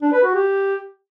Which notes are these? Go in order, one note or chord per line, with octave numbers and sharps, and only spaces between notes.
D4
B4
F#4
G4